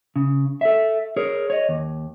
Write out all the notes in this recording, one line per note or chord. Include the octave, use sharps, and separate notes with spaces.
C#3
A4 E5
G#4 A#4 C#5
C#5 D#5
D#2